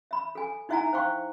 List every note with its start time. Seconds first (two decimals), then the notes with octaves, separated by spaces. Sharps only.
0.11 E5 B5
0.35 A4 G#5
0.69 D#4 E4 E5 F#5 G#5 A#5
0.93 C5 F5 G5 C#6